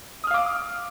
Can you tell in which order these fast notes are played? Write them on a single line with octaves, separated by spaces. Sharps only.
D#6 F6 F5 D6